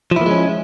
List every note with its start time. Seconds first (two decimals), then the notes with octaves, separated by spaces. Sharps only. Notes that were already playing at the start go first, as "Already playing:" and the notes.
0.11 F3
0.16 E4
0.21 A#3
0.26 G#3
0.31 C#4